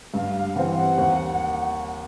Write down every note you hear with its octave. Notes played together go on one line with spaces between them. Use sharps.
G2 F5
F5
E3 G3 C4 F#5
F#5
D#2